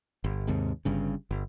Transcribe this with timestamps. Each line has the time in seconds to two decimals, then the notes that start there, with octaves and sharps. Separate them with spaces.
0.24 G1
0.47 D#2 G#2 C3
0.85 G1 G2 C#3
1.31 G1